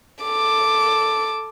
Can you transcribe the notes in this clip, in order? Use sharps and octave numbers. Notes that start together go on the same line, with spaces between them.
A4 D6